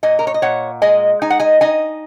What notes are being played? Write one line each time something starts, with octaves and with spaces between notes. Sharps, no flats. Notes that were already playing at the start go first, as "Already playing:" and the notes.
A#2 D#5 G#5
A#4
C#5
D#5
A#2 C#5 F#5
G#3 D#5 G#5
D#4 G#5
F#5
D#5 G#5
D#4 D#5 G#5